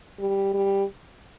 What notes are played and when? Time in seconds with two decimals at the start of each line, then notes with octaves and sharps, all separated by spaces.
0.19 G3
0.54 G3